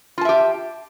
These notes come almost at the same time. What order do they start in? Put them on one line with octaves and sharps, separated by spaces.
F4 A5 E5 G4